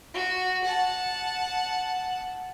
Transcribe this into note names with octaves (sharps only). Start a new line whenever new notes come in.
F#4
F#5 A5